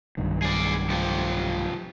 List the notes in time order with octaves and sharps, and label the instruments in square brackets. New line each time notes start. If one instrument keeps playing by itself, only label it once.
[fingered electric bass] B1 G2 D#3
[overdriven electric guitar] G#4 D5
F3 G4